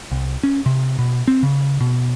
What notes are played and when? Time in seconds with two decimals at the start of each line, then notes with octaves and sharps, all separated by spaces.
0.12 C2
0.43 C#4
0.66 C3
0.99 B2
1.28 C4
1.43 C#3
1.81 B2